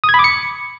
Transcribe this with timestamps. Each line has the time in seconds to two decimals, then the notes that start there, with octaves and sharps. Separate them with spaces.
0.04 D#6
0.09 G#6
0.14 B5
0.19 D6
0.24 C#7